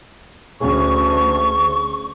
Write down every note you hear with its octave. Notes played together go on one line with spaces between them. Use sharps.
D2 C#4 G#4 C#6